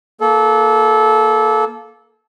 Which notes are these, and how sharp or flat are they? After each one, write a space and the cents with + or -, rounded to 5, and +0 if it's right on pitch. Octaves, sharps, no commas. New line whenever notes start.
A#3 +0 A4 -25